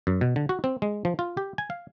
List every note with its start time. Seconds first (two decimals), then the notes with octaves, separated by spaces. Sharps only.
0.07 F#2
0.21 B2
0.36 D3
0.49 F#4
0.64 C4
0.82 G#3
1.05 F3
1.19 F4
1.37 G4
1.58 G#5
1.70 F5